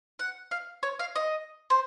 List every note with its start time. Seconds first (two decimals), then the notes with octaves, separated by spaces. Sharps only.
0.19 F#5
0.51 F5
0.83 C#5
0.99 F5
1.16 D#5
1.70 C5